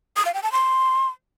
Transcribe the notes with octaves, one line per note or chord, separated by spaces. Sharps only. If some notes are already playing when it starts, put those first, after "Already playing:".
D#6
F5
G5
A5
C6